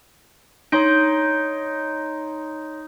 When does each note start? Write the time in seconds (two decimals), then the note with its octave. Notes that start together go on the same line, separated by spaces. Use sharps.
0.72 D#4 C#5 C6 D7